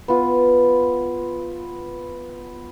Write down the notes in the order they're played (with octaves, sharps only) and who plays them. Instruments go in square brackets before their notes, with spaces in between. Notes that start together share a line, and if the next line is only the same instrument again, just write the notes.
[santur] B3 F4